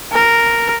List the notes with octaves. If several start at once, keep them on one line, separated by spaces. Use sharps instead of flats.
A#4